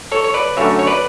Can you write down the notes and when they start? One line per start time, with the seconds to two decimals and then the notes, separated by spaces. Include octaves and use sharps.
0.12 A4 C#5
0.24 C#5
0.34 B4 D5
0.57 F#2 D3 A3 C#5 E5
0.79 C#5
0.87 B4 D5